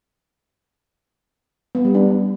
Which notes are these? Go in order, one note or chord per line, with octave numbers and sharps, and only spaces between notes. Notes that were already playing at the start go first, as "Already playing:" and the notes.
B3
G3
D4